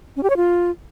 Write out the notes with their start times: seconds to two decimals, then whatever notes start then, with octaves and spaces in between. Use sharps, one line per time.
0.16 C#4
0.23 G4
0.30 C#5
0.37 F4